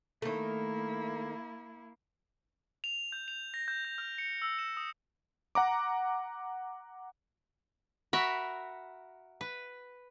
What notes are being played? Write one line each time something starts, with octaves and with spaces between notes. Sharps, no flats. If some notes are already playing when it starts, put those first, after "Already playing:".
D#3 A3 A#3 E4
F7
G6
F7
A#6
G6
G6
F6
C#7
E6
E7
D#6
F#5 A#5 D6
F#4 A#4 E5 B5
B4